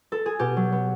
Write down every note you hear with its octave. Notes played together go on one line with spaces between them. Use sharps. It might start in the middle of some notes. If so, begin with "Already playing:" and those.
A4
G#4
B2 G4
F#3
B3